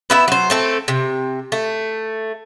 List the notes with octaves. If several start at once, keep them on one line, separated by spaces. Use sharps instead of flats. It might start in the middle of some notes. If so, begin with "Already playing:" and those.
B3 E4 E5
F#3 C5
A3 C4 A4
C3
A3